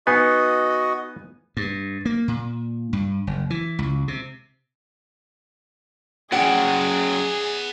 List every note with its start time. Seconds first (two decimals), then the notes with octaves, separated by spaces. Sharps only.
0.07 B3 D#4 F#4 B4 D#5 G#5
1.57 G2
2.05 A#3
2.28 A#2
2.93 G2
3.27 F#1
3.50 E3
3.79 C#2
4.08 C3
6.32 F#3 B3 C#4 G#4 D5 F#5 G5